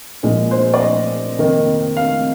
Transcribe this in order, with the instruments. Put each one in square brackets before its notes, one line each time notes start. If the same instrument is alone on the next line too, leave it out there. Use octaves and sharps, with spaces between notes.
[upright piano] A#1 A#2 G#3 D#4
C5
D5
D#5
F2 C3 D#3 A#3 D#4
F5